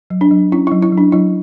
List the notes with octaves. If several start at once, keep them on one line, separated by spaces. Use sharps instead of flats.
F#3
D4
F#3
C#4 E4
F#3 E4
E4
F#3
D4
F#3 E4